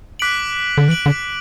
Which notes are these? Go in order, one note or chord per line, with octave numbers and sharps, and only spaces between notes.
D6 F#6 B6 D7 F#7
D3
E3 F#6 D7 F#7
D3